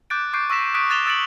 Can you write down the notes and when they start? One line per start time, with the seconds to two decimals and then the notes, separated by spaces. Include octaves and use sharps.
0.10 D6 F#6 G6 A6 D7
0.33 C#6 D6 F#6 G6 C7 D7
0.50 C#6 E6 A#6 B6 E7
0.74 D#6 F#6 G6 B6 D7
0.90 F#6 A6 E7 F7 G7
1.06 D#6 E6 A6 C#7 D7 F#7